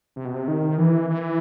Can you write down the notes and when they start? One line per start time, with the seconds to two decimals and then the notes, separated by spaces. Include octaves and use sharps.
0.16 C3
0.25 B2
0.34 C3
0.48 D#3
0.78 E3
1.10 E3